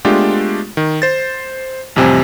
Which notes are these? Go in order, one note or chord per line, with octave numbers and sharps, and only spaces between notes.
G#3 A3 B3 D4 F4 G4
D#3
C5 A6
A1 F2 C3 G3 C4 G#5